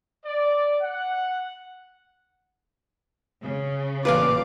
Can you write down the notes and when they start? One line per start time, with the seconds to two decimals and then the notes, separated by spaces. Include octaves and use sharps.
0.24 D5
0.81 F#5
3.41 C#3
4.05 A1 A#2 F4 B4 D5 F5 D6